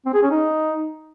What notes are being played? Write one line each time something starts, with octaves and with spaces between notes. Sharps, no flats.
C4
G#4
C#4
D#4